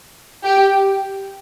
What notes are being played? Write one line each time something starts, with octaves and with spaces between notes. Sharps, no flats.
G4